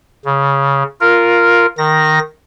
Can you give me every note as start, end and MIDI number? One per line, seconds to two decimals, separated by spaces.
0.25 0.83 49
1.01 1.66 65
1.01 1.66 70
1.78 2.19 51
1.78 2.19 94